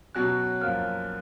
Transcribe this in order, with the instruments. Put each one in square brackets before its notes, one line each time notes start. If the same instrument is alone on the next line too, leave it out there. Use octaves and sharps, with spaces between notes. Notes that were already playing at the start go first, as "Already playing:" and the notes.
[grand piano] B2 F#3 C#4 F#4 [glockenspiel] F#6
[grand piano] F#2 F3 A#3 [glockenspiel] F6